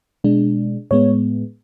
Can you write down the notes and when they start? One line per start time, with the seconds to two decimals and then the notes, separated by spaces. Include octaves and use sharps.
0.24 B2 G#3 D4
0.91 A2 G#3 B3 C#5